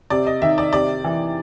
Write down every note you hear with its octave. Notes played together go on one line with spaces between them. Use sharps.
C3 D5
D#5
D#3 E5
D5
C3 D5
E3